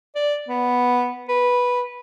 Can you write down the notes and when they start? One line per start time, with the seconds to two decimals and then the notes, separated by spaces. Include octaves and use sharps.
0.15 D5
0.49 B3
1.29 B4